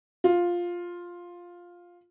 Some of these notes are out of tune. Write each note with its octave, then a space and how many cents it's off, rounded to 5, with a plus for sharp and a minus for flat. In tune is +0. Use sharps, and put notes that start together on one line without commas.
F4 +5